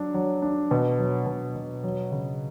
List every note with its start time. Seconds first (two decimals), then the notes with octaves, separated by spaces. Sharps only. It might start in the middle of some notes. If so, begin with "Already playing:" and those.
Already playing: F#3 D4
0.14 F#3
0.42 D4
0.71 B2
0.99 F#3
1.27 B2
1.56 B2
1.84 F#3
2.12 C#3